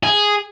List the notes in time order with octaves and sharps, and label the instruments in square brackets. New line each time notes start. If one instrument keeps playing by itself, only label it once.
[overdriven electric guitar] G#4